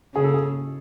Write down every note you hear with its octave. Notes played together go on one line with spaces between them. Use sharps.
C#3 G#4
A4
G#4